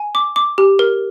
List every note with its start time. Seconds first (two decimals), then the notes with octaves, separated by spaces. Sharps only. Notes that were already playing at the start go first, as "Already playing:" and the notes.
Already playing: G#5
0.15 D6
0.36 D6
0.58 G4
0.79 A#4